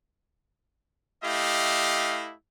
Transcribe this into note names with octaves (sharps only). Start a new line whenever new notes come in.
A3 E4 G4 D#5 F5